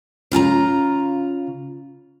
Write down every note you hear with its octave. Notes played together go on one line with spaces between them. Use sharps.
C#3 F4 G#5 A#5